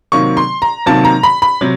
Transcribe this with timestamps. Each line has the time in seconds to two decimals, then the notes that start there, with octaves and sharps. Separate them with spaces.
0.12 C3 D#3 F#3 A#3 C#6
0.37 C6
0.62 A#5
0.86 C3 D#3 F#3 A#3 A5
1.05 A#5
1.23 B5
1.42 B5
1.61 C3 F#3